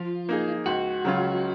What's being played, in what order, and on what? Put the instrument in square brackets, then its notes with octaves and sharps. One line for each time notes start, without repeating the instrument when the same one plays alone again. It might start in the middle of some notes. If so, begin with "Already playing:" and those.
Already playing: [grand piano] F3 [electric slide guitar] F4
[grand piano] A#3 D#4 G#4
[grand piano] C#2 [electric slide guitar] F#4
[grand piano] C#3 F#3 C#4 F4